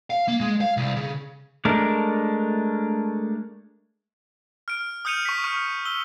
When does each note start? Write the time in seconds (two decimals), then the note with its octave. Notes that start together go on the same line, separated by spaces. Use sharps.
0.10 F5
0.28 A#3
0.41 G#3
0.61 F5
0.77 C2
0.96 C#3
1.65 G#3 A3 D4 A#4
4.68 F6 D7
5.05 D#6 F6 G6 C#7 D#7 F7
5.25 C#6 B6
5.44 C#6 F6
5.85 E6 G7